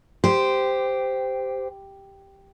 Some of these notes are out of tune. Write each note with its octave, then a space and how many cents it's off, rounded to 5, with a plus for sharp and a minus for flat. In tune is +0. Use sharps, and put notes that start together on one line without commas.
G4 +0 C5 -15